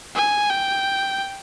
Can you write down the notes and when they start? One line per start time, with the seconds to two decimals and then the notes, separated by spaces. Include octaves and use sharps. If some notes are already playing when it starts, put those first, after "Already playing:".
0.15 G#5
0.49 G5